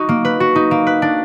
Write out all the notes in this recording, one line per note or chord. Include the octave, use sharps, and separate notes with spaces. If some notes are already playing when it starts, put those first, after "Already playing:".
Already playing: D#4 F#4
A#3
B4
F#4
D#4
A#3
B4
D4